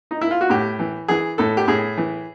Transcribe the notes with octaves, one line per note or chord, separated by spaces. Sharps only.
D#4
E4
F4
F#4
A2 G4
E3
E3 G#4
A2 A4
G4
A2 G#4
E3